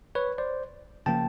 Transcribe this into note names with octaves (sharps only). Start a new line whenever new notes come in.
B4 C#5
C5 D5
C#3 F3 A#3 G5 A5